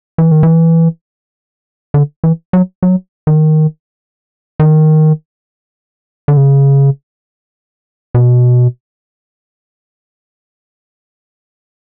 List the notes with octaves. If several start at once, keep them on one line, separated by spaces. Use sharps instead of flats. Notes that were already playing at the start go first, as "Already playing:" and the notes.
E3
D#3
E3
D3
E3
F#3
F#3
D#3
D#3
D3
C#3
B2